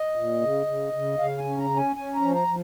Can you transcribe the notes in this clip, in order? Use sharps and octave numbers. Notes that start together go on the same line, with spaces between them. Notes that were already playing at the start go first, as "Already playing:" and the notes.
Already playing: D#5
A#2
C#3
C#3
C#3
C#3 F5
G#5
C#4
A#5
C#4
G#5
C#4 G#5
A#5
F3
A#5
F3